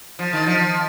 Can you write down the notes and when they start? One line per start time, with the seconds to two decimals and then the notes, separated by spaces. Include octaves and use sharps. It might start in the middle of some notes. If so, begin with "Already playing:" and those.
0.19 F3
0.33 D#3
0.46 F3